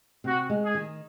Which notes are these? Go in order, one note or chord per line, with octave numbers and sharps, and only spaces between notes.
C3 F#4
G#3
G#4
D#3